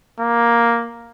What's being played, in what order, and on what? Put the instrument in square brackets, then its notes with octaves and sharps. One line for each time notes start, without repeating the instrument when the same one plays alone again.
[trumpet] A#3